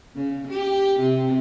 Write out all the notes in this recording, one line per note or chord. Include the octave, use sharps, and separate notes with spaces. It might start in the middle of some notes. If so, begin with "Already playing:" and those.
C#3
G4
C3